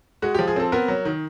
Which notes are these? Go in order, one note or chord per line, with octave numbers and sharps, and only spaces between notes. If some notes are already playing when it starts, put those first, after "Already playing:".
G#3 F#4
G4
F3
G#4
C4 A4
B3 A#4
F#3
D#3